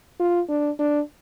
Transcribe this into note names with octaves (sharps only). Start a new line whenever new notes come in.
F4
D4
D4